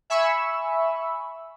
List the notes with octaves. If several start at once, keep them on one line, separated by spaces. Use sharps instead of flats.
E5 G#5 B5 C#6 E6